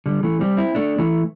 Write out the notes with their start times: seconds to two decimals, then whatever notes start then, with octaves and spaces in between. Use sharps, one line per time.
0.06 D3 G3
0.23 E3 A3
0.40 G3 C4
0.57 C4 E4
0.75 A3 D4
0.98 E3 A3